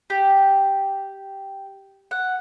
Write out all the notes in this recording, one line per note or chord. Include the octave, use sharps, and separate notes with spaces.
G4
F#5